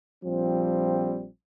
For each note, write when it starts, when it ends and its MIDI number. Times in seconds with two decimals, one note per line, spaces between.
0.24 1.27 34
0.24 1.27 53
0.24 1.27 55
0.24 1.27 60